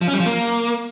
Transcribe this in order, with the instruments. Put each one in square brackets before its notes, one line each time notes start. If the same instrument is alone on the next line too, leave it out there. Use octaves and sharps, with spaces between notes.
[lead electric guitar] F3
C#4
G3
F3
A#3